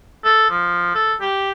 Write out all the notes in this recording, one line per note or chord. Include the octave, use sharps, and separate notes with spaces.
A4
F3
A4
G4